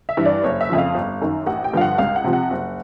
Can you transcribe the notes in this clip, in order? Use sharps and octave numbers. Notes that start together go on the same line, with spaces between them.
E5
G2 E3
D5
F#1 C#5
E5
F2 C#3 F3
F5
G1
F#2 D#3
A1 F#5
G5
G2 D3 F3 F5
F#5
C#2 F5
F#5
C3 F3
F#5
F#1